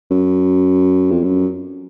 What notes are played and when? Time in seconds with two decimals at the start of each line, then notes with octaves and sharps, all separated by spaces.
0.11 F#2
1.11 F2
1.23 F#2